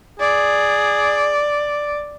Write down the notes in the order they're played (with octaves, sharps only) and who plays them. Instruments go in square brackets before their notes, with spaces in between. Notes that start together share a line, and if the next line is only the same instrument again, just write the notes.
[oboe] G#4 [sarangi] D5